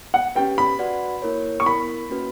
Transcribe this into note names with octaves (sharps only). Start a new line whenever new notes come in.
F#5
C#4 G4 B4 G5
B5
F#4 B4 D5 F#5
A#3 E4 A#4 C#5
C#6
B3 E4 A#4 B5
A#3 C#4 F#4 B4